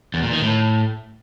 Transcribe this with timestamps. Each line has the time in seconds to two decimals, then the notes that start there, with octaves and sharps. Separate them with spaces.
0.14 E2
0.23 A#2
0.32 D#3
0.41 A2